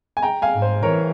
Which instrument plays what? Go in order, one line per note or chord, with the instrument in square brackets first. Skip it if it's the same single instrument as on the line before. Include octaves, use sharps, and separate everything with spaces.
[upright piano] G#5
G5 A#5
F5 G#5
[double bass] G#2
[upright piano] C5
[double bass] E3 [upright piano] A#4 C#5